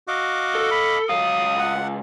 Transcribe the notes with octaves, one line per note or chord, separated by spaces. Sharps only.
F#4 D#5 F5 D6
A4
B5
C#2 F#3 F5 D#6
F#5